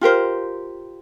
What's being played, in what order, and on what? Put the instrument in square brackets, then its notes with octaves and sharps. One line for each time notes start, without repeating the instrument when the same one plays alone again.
[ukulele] F4 G4 A#4 C5